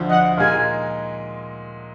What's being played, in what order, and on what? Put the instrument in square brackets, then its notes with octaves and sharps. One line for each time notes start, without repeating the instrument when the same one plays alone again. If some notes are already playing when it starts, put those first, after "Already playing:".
Already playing: [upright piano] D2 D3 F3
[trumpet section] D#5 F#5
[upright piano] A#2 G#3 D#4 [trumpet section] F5 G#5